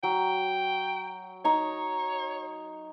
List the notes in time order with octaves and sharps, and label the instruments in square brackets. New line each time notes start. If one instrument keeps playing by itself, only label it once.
[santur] F#3 [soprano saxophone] G5
[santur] D#4 A#5 [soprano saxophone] C#5